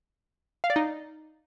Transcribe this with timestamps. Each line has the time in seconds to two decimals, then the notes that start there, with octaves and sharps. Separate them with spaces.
0.64 F5
0.70 D5
0.76 D#4